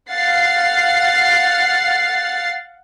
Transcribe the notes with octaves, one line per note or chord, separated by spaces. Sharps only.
F5 F#5 A6 C7